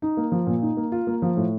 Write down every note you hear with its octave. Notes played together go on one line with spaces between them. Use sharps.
D#4
A#3
F3
A#2
D#4
A#3
F4
A#3
F3
A2